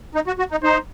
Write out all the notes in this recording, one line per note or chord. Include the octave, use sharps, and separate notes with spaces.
D#4
F#4
F#4
D#4
D#4 C5